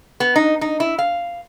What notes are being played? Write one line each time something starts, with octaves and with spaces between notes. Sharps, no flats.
B3
D#4
D#4
E4
F5